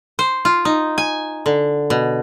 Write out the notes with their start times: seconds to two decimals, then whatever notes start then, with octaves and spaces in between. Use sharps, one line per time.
0.19 C5
0.45 F4
0.65 D#4
0.98 G#5
1.46 D3
1.90 B2